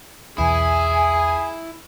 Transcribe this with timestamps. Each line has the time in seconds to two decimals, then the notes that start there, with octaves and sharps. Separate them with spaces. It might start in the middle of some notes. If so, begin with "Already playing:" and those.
0.38 B1 E2 E4 G#4 G#5